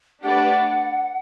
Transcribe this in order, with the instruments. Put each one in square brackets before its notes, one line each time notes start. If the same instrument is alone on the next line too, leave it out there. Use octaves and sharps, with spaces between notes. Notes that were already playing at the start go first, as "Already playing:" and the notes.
[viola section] A3 D4 G4 B4 D5 [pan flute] F#5